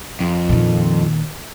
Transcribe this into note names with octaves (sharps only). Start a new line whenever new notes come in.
F2
A#2 D#3